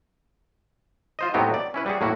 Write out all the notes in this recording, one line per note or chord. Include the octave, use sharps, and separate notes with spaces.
F4 C5 D#5
A2 F#3 B3 C4 D#4 G4
D5
C#4 E4 B4
G3 F#4 G#4
A2 A#3 E4 F#4